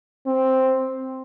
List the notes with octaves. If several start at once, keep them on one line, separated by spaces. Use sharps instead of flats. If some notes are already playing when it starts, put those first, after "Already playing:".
C4